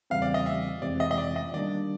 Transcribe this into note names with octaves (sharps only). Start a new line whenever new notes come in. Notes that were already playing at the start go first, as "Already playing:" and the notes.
E2 C#3 E3 G3 C4 F5
D5
D#5
E5
F2 C3 E3 G#3 C4 D5
D#5
D#5
D5
D#5
D#3 G3 A#3 D4 D5